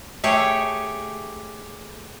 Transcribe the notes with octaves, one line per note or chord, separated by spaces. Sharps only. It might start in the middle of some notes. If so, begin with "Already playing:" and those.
A3 G4 G#4 C#5